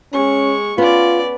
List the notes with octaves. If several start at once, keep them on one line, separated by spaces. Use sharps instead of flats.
G#3 C#4 C#6
B3 C#4 F4 D5